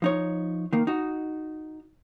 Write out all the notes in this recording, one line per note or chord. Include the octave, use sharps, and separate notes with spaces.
F3 D#4 C#5
D#3 A#3
D#4 F#4